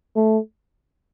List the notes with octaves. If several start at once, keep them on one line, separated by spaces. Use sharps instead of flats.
A3